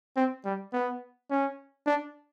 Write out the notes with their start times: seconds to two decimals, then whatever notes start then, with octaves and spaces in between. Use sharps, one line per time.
0.16 C4
0.45 G3
0.73 B3
1.30 C#4
1.86 D4